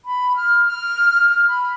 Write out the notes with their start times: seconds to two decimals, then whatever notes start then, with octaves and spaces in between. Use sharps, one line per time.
0.05 B5
0.36 F6
0.66 F6
1.28 F6
1.48 B5